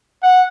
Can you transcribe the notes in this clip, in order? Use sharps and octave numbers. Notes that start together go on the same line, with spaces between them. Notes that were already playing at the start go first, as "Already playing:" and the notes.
F#5